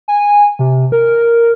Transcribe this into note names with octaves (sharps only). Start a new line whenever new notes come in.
G#5
C3
A#4